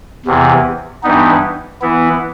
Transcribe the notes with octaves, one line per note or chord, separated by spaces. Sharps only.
E2 C3 E3
G2 E3 G3 B3 D#4
E3 B3 E4